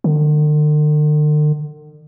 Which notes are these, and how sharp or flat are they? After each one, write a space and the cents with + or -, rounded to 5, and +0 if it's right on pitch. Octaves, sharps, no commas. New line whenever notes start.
D3 +45